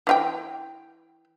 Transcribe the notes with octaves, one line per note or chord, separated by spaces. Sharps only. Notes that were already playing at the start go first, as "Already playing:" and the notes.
E3 F4 G5